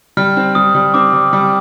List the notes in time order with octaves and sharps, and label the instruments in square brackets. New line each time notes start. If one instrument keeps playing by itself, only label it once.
[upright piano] G3 [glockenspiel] F6
[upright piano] C4
[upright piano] G3 [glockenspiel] D#6
[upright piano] G3
[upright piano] C4 [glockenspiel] D6
[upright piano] G3
G3